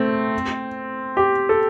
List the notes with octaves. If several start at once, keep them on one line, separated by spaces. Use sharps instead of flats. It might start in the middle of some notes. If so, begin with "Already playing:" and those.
Already playing: A3 C4
G4
A4